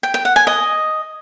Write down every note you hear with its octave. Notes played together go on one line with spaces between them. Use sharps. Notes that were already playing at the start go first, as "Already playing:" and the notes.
G5
G5
F#5
G#5
D#5